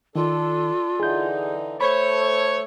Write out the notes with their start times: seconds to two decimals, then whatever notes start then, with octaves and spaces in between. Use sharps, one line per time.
0.15 D#3 D4 F4 A4
1.00 D3 E3 D#4 G#4 G6
1.81 A3 A4 C5 C#5 B5